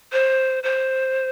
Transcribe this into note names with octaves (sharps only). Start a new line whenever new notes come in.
C5
C5